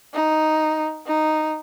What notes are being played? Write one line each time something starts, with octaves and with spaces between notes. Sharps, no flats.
D#4
D#4